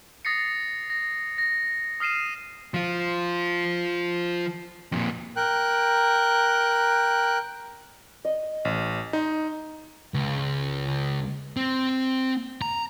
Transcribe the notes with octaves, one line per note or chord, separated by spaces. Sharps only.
D#6 A6 A#6 C7 C#7
A#6
A#6
D#6 F6 C7 D#7 E7
F3 F4
F2 A#2
A#4 G5 F#6
D#5
A1
D#4 C6
C#2
C4
A#5